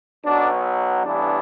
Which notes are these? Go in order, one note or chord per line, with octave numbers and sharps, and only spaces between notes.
B1 B2 F#3 D4
A1 G2 E3 B3 D4